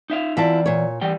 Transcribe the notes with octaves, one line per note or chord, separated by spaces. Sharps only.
D#4 E5 F5
E3 E4 F4 D5 A5
A#2 C#5
E3 G3 G5